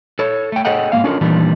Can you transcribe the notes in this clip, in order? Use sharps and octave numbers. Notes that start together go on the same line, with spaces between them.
A4 C#5
A3 G5
G#4 A4 C#5 D#5 F#5 G5
G#2 C#3 A#3 F5
C#4 D4 F4 A4 A#4
A#2 D#3 E3 G3 D4